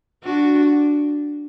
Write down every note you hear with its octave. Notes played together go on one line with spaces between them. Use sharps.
D4 F#4